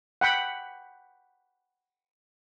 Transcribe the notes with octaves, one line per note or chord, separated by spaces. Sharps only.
F#5 G5 B5